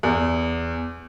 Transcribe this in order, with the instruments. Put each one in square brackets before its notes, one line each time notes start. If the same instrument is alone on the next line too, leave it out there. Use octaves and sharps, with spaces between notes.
[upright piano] E2